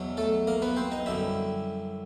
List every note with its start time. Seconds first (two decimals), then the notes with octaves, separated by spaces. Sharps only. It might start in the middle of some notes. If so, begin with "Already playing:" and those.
Already playing: E2 B2 F#3
0.17 A3 A4
0.47 A#3 A#4
0.62 B3 B4
0.76 C4 C5
0.91 D#4 D#5
1.06 F#2 D3 G3 E4 E5